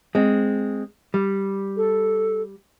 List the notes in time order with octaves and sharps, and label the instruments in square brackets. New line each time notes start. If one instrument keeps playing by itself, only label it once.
[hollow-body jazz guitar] G#3 C4
G3
[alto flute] A4